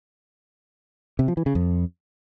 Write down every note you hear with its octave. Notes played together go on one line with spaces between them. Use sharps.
C3
F3
E3
C#3
F2